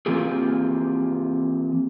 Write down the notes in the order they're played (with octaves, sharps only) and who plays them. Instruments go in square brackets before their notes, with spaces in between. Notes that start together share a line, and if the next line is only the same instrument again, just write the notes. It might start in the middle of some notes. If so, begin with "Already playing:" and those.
[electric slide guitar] E3 A#3 C4 F4 G4 G#4